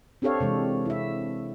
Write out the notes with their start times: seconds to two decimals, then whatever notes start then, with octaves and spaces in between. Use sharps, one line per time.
0.22 C4 D4 G4 A4 C#5 F5
0.40 C3 E3 G#3
0.86 E4 E5